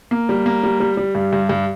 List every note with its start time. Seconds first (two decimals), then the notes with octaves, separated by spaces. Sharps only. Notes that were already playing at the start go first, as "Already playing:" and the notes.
0.11 A#3
0.29 G3
0.46 A#3
0.64 G3
0.80 G3
0.97 G3
1.15 G2
1.33 G2
1.49 G2